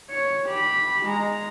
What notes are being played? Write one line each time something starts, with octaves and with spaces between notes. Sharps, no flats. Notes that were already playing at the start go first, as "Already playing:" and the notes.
C#5
G4 B5
G#3 A#5